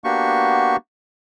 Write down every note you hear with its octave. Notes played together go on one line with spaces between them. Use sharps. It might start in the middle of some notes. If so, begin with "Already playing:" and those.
A#3 B3 D4 F#4 G4 C#6